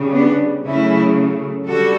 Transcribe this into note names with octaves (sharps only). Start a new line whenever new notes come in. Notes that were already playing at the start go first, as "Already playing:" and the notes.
Already playing: C#3 G3
B3 D4
C#3 F#3 A3 C#4 E4
D3 G3 F#4 A4